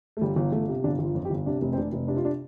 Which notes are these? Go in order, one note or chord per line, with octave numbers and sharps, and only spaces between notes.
A3
G1 G3
G1
G1 A3
C3
G1 D4
G1
F4
F2
G4
G1
C3 D4
F1
C4
F1 D4
F1
C3 D4
F4
D4